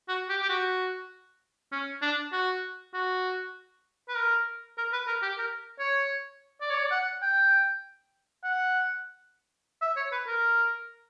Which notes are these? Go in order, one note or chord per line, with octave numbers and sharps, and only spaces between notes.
F#4
G4
G4
F#4
C#4
D4
F#4
F#4
B4
A#4
A#4
B4
A#4
G4
A#4
C#5
D5
C#5
D5
F#5
G5
F#5
E5
C#5
B4
A#4